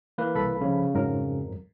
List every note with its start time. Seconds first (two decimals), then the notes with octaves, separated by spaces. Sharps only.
0.18 E3 A#3 B4
0.35 C2 A4 B5
0.61 C#3 F3
0.94 F2 G#2 F#3 A#4